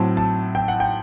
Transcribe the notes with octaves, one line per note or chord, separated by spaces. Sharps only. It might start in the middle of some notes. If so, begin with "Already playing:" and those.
Already playing: A2 F#3 C4 A5
A5
G5
F#5
G5